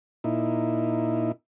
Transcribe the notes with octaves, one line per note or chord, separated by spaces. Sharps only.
A#2 D#4 E4